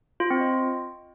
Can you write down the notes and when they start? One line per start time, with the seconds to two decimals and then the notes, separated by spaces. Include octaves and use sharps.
0.20 F4
0.30 C4
0.41 D#5